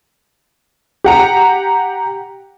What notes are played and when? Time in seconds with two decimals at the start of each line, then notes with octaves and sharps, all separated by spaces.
1.04 G4 F#5 A#5